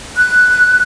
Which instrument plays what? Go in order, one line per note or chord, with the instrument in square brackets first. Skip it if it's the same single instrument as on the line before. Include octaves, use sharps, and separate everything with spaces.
[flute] F#6